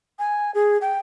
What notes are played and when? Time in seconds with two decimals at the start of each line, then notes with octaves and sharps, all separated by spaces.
0.19 G#5
0.55 G#4
0.81 G5